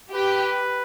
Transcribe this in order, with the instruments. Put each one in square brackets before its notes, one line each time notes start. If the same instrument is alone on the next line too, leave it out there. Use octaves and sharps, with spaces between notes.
[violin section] G4 [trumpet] B4